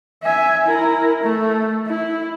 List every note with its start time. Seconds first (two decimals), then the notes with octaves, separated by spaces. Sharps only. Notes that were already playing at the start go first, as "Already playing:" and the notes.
0.23 E5 G#5
0.65 E4 A#4
1.23 A3
1.87 E4